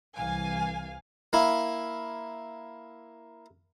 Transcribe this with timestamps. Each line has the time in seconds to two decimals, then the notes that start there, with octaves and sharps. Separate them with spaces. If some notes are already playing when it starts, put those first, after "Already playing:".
0.15 C2 E3 F5 G#5
1.33 A#3 E4